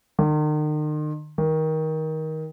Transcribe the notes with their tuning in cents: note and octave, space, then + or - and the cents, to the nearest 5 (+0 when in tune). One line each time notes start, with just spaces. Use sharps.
D#3 -40
D#3 +20